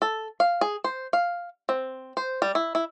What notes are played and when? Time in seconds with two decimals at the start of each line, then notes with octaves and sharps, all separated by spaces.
0.02 A4
0.40 F5
0.61 G#4
0.84 C5
1.13 F5
1.69 C4
2.17 C5
2.42 G3
2.55 E4
2.75 E4